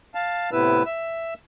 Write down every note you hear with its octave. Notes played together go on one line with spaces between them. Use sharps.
F5 A5
A2 C3 B3 E4 B4 E6
E5 E6